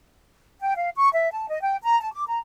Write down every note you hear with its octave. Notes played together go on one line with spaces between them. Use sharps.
G5
F5
C#6
E5
A5
D#5
G5
A#5
A5
D6
A#5